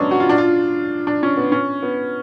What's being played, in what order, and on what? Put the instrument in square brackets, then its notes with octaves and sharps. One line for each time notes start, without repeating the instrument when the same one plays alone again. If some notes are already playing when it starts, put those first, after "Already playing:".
Already playing: [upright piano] F3 F#3 G#3 B3 C#4 D4
F#4
F4
D4
F4
D4
C#4
B3
C#4
B3